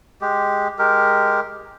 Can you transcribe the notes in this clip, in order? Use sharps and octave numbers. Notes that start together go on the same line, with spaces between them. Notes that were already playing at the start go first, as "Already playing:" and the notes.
G#3 G4
G#3 G4 A#4